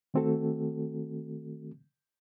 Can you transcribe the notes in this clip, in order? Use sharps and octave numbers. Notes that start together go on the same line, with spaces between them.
D#3 A3 C4 F#4 A4